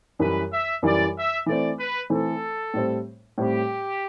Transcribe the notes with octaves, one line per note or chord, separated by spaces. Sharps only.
F#2 E3 G3 B4
E5
F#2 E3 G3 D5
E5
E3 A3 C4 D5
B4
E3 A3 C4 A4
A2 G3 C4
A2 G3 C4 G4